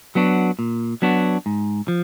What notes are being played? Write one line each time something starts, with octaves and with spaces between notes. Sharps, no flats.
F#3 B3 D4 F#4
A#2
F#3 B3 D4 F#4
G#2
F3